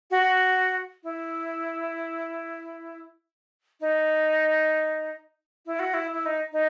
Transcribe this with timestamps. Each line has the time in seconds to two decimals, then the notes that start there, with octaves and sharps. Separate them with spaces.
0.10 F#4
1.03 E4
3.80 D#4
5.65 E4
5.79 F#4
5.93 E4
6.13 E4
6.25 D#4
6.52 D#4